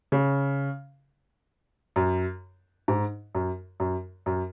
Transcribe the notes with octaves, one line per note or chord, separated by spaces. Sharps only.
C#3
F#2
G#2
F#2
F#2
F#2